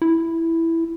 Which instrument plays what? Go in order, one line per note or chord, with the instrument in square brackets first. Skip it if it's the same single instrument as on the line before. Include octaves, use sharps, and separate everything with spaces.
[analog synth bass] E4